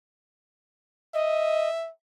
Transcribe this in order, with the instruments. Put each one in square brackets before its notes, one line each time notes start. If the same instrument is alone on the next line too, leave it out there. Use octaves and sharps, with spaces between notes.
[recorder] D#5 [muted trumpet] E5